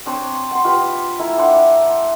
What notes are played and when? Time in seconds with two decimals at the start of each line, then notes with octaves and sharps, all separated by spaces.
0.06 C4 D4 C5 C#5
0.51 F#5 C6
0.64 F4 G4 B4
1.19 A3 E4 A#5
1.38 D4 C5 F#5 D6